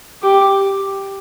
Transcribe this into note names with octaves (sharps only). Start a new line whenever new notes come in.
G4